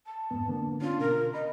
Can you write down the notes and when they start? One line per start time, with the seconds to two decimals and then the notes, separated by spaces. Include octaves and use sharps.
0.06 A5
0.31 F2 G#2 B3
0.48 D3 A#3 B3
0.81 C#4 D4 F4
1.00 B2 A#4
1.34 D#5 B5